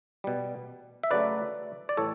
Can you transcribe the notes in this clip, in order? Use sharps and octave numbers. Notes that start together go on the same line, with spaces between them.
B2 G3
E5
C#3 F#3 A3 B4 D5
D5
A2 E3 G3 A4 C#5